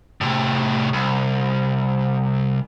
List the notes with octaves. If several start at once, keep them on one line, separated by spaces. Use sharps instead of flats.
A2 C3
C2